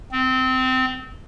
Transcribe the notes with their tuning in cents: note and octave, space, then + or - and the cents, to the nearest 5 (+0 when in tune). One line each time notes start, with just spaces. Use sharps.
C4 -20